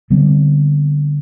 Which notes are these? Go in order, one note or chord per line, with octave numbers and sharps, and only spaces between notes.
D3 G3 B3 C4